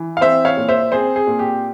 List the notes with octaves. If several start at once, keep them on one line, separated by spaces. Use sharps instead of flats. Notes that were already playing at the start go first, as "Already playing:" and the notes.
Already playing: E3
F5
C4 C5 E5
C#5 F5
A#2
C5 E5
C4 G#4 C5
G#4
A#2
G4